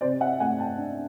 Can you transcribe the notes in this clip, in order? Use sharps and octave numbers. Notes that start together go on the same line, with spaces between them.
C3 C5 D5
E5 F#5
A3 F#5 G#5
G5 A5
D4